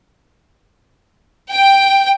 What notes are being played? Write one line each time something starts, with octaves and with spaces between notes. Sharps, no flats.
G5